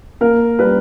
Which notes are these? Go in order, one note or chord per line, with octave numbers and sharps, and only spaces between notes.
A#3 A#4
G3 B4